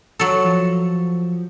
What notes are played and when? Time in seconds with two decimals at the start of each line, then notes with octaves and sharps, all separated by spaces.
0.19 F#3 A4
0.44 F3